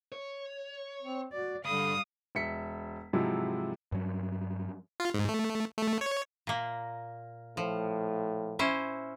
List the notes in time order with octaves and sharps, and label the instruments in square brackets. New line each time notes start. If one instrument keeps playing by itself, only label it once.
[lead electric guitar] C#5
[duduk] C4
[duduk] F#4 [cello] D5
[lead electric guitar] G2 B5 [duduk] D3 [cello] G3 F5 [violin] D#6
[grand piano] E1 E5 B6 C#7
G#2 C3 F3 F#3 G#3 E4
[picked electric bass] G2 F#3
[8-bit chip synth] F4
G#2
A3
A3
C#5
[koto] A#2 A#3
[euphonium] A2 [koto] F3
[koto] C#4 E4 C5